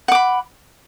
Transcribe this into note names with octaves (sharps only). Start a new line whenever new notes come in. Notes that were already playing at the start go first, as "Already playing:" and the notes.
F#5 B5 D6